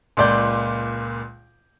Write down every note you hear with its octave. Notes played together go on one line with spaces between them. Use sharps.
C#2 A#2 D5 G6